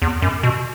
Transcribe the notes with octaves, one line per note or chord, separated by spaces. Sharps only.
E2
F#2
B2